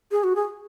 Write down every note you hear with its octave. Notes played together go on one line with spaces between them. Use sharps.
G#4
F#4
G#4